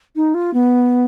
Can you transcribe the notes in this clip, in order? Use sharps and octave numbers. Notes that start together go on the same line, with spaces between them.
D#4
F4
B3